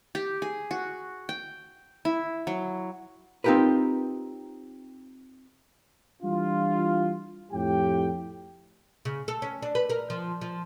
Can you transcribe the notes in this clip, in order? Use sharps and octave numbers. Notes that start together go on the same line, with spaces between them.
G4
G#4
F#4
G5
E4
F#3
C4 D#4 F4 G4 A#4 B4
E3 G3 D4 E4 F4
F2 A2 G4 G5
C#3
A4
C#4
D4
B4
A#4
F3
F3